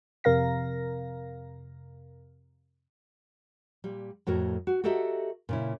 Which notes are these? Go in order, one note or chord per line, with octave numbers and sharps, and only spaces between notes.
F2 C3 A#4 F5 A#6
A#2 G3
F2 A2 F#4 A#4
F#4
F#4 G4 A4 A#4 D#5 E5
A#2 C#3 E4